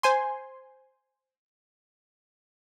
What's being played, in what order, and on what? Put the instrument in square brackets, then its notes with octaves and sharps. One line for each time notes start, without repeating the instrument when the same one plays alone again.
[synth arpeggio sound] C5 G#5 C6